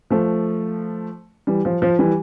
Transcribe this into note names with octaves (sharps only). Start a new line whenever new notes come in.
F3 A3
E3 G3
F3
F3
E3 G3